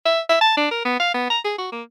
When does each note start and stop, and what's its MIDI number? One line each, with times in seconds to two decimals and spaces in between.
0.06 0.20 76
0.29 0.38 76
0.41 0.54 81
0.57 0.67 62
0.71 0.81 70
0.85 0.98 59
1.00 1.11 77
1.14 1.29 59
1.30 1.39 82
1.45 1.58 68
1.58 1.67 66
1.72 1.83 58